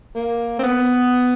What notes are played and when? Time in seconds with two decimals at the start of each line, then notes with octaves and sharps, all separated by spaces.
0.15 A#3
0.59 C4
0.63 B3